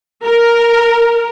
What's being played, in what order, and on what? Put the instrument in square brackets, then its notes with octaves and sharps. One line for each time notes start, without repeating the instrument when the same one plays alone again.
[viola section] A#4